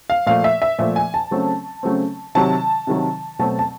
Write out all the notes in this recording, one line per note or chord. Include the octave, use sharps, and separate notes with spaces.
F5
A#2 F3 A3 F5
E5
E5
A#2 F3 A3 E5
G#5
A5
C#3 F#3 A3 C4
C#3 F#3 A3 C4
C3 D#3 F#3 A5
C3 D#3 F#3
B2 F#3 A3 C4 A5
A5